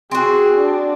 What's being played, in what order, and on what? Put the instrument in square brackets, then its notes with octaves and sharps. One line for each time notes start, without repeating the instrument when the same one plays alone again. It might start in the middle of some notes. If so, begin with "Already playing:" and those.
[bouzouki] C4 F#4 [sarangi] G#4
[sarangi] D4